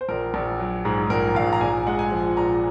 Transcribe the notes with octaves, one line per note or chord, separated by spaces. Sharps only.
C5
A#1 A#4
A#1
F#3
G#2 G#4
A#1 A#4
A#1 F5
A#5
A#1 G#5
G#3 F#5
G#5
F3
A#2 A#5